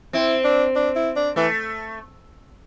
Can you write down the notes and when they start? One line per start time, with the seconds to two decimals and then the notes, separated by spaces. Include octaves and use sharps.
0.13 C4 E4
0.44 D4
0.76 D4
0.96 E4
1.16 D4
1.36 E3 A3